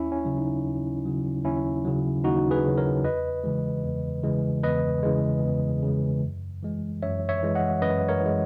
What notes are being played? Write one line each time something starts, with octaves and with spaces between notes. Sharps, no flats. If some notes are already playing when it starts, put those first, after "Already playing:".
Already playing: D#2 C#4 E4
C#4
C#3 F#3
D#4
D#2
C#3 F#3
D#2 C#4 E4
C#3 F#3
D#2 D#4 F#4
G#4 B4
C#3 F#3
A#4 C#5
E2 B4 D#5
C#3 E3 G#3
E2
C#3 E3 G#3
E2 B4 D#5
C#3 E3 G#3
E2
C#3 E3 G#3
F#2
E3 G#3
F#2 C#5 E5
C#5 E5
E3 G#3
D#5 F#5
F#2 B4 D#5
A#4 C#5
E3 G#3